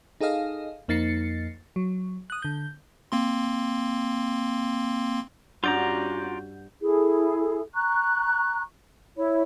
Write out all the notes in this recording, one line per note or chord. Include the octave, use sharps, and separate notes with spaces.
D#4 G#4 A4 D#5 F5
F2 A#3 D#4 A6 C7 C#7
F#3
D#6 F#6
D3 G6
A#3 C4 C6
G2 C#4 F4 F#4 D5 F#5 A#5 G6
E4 G#4 A4
A#5 C#6 F#6
E4 C#5